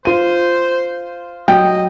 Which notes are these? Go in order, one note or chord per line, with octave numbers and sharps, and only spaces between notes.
F4 C5 D#7
F#3 D#5 G5